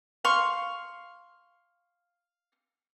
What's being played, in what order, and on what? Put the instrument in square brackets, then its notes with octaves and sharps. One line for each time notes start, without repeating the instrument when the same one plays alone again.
[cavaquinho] F5 C6 C#6